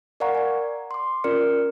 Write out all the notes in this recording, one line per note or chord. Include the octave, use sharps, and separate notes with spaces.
A#4 D5 F5 F#5 A#5 C#6
D5 G#5
C6 D6
C#4 F4 A#4 D5 F6 C#7